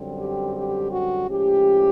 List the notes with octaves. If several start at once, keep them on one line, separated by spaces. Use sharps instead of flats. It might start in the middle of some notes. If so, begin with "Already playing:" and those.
Already playing: F#2 D3 G3 C4
G4
G4
F#4
A2 F3 G#3 C#4 G4